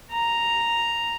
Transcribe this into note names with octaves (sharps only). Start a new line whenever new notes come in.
A#5